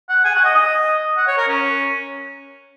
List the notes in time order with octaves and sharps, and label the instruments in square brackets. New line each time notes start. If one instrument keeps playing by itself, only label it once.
[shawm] F#5
G#5
F#5
D#5
D#5
F#5
C#5
A#4
C#4